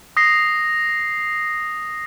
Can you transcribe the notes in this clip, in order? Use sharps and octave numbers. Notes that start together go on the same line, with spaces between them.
D#6 A#6 C7